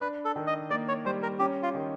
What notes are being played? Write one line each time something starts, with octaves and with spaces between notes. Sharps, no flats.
D4 B4
A4
D#3
D#5
A#3 D5
C#5
G3 C5
A#4
C#4 G4
F4
D#3